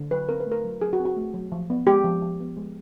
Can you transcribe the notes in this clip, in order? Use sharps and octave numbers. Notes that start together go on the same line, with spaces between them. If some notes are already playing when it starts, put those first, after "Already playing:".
Already playing: D3
F#3 B4
C4 A#4
B4
A3
A#4
F#3
F#3 G#4
F#4
C4
F#4
A3
F#3
F3
B3
G#3 G4
F3
F3
B3
G#3